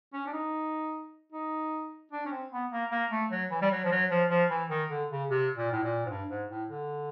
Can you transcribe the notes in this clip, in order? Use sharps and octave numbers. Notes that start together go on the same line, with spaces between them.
C#4
D4
D#4
D#4
D4
C#4
C4
B3
A#3
A#3
A3
F#3
E3
G3
F#3
F3
F#3
F3
F3
E3
D#3
D3
C#3
C3
A#2
A2
A#2
G#2
G2
G#2
A2
D3